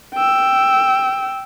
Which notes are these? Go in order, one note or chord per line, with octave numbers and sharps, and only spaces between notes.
G5 E6